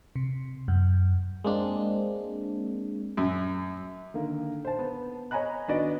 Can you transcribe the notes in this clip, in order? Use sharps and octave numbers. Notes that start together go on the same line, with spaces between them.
C3
F#2
G#3 A#3 C4 D4
F#2
D3 D#3 A#3
C5 A5
B3
C#5 D#5 G#5 A#5 B5 F#6
D#3 B3 D4 F#4 D5 D#5